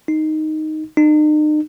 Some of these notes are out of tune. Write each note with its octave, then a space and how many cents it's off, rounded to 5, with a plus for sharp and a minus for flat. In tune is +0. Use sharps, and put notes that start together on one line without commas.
D#4 +0
D#4 -40